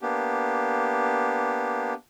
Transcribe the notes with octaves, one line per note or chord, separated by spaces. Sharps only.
A#3 B3 D4 G4